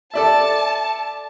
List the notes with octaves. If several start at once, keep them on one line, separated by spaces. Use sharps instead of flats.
A4 D5 E5 A5